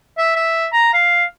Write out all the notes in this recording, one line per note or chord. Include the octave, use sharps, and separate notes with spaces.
E5
E5
A#5
F5